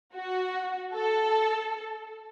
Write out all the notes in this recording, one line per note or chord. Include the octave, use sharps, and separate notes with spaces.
F#4
A4